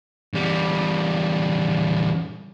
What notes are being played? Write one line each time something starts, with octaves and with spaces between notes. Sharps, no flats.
E2 G3